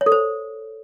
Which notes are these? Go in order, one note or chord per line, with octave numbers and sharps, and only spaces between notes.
C#5
A4
C5